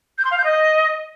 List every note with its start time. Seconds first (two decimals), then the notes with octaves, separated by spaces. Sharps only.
0.18 G6
0.25 C6
0.31 F5
0.38 G6
0.44 D#5